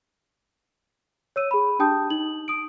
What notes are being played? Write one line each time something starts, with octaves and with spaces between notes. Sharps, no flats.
C#5 E6 D#7
G#4 B5
D4 G4 G5 A5 D#6 G6
D#4 F#7
D#6 D7